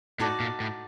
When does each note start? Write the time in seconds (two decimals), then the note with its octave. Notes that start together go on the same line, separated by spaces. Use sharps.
0.20 A2 D#4 F#4 A4 D5
0.40 A#2
0.60 A2